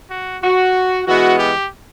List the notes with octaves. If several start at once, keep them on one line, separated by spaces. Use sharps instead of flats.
F#4
F#4
E3 G#3 B3 F#4
G4